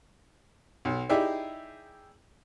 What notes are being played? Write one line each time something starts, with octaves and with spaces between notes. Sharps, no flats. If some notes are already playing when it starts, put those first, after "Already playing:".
B1
D#4 E4 G4 G#4 D5 E5